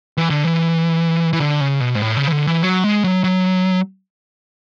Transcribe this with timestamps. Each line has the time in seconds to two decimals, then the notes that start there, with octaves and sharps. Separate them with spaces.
0.17 E3
0.30 D3
0.45 E3
1.33 E3
1.40 D3
1.61 C#3
1.81 B2
1.95 G#2
2.01 A2
2.17 C#3
2.27 E3
2.32 D3
2.47 E3
2.62 F#3
2.84 G#3
3.04 F#3
3.24 F#3